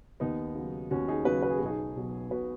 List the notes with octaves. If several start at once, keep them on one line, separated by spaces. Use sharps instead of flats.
D#2 B3 D#4
C#3 F#3
D#2 C#4 F#4
D#4 G#4
C#3 F#3 F#4 B4
B4
G#4
F#4
B1 D#4 G#4
B2 F#3
B1 F#4 B4